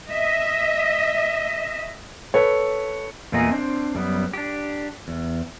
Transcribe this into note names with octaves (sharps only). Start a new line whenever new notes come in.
D#5 E5
A4 B4 C#5
E2 A#2 A3 A#3 D#5 G#5
C4 D4 C5
F#2 G3 B3
D4 G4
E2